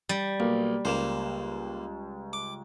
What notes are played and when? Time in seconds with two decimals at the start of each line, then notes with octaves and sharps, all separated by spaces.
0.09 G3
0.40 B1 A#3
0.85 C#2 A#3 C5 E7
2.33 D6